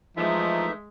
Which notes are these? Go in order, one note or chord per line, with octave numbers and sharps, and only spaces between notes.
E3 F3 G#3 A3 D#4 E5